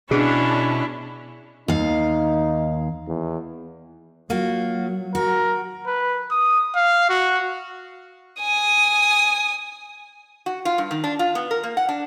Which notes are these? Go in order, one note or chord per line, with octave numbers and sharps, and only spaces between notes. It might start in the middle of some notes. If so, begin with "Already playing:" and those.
B2 C#4 D4 E4 G#4
D#2 D#4 F5
E2
F#3 A#3 F4 F#4
F#4 A#4
B4
D#6
F5
F#4
G#5 D#6
F#4
F4
G2
D#3
D4
F4
B3
A#4
A#3
F#5
D4